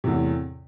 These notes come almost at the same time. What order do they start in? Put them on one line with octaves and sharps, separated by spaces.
C3 E2 A2